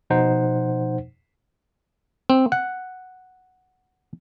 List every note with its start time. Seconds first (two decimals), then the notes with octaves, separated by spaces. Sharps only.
0.10 B2 F3 D#4 C5 F#5
2.30 C4
2.52 F#5